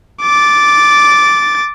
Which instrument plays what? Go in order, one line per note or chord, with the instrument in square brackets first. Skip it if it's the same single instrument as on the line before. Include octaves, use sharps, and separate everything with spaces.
[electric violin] D6 A6